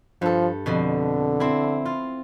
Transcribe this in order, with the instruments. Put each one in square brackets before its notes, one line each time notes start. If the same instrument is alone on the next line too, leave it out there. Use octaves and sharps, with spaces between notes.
[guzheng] G2 A4 [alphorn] F3
[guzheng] F2 B2 [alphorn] D3
[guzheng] C4 E4
F4